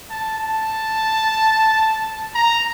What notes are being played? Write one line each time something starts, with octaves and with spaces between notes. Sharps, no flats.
A5
A5
A#5